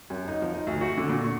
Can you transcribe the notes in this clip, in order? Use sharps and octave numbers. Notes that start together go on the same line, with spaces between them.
F#2
D#4
F3
D#4
D2
F#4
D3
A#2
C#6